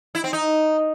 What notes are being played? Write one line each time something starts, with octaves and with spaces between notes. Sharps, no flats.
E4
C4
D#4